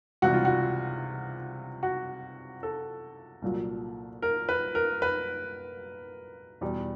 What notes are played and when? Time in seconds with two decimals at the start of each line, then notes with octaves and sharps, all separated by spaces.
0.22 C#2 C3 E3 G3 F#4
0.34 F4
0.45 F#4
1.83 F#4
2.63 A4
3.42 C2 A#2 F#3
4.22 A#4
4.49 B4
4.75 A#4
5.02 B4
6.61 E2 B2 G3